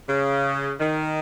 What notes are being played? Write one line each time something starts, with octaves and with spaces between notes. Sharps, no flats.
C#3
D#3